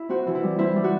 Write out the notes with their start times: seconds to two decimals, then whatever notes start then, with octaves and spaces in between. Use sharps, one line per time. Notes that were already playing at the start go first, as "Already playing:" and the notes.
Already playing: E4
0.09 C4 F#4
0.27 E3
0.35 E4
0.43 G3
0.59 C4 E4
0.76 G3
0.84 F#4